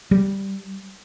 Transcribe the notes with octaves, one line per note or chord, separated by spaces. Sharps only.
G3